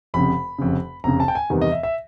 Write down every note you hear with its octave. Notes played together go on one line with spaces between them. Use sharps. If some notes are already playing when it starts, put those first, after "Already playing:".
F1 F2 C#3 B5
F1 F2 C#3
F1 F2 C#3 A#5
A5
G5
G#5
E2 C3 D#3 G3 B3
D#5
E5
E5